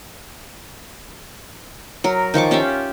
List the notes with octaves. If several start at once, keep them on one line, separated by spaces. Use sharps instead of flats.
F#3 A#4
D#3 F3 C#6 D6
C#4 F4 G4 E5